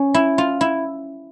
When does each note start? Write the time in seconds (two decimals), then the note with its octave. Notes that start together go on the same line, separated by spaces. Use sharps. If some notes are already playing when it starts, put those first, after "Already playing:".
Already playing: C#4
0.14 E4
0.38 F4
0.61 E4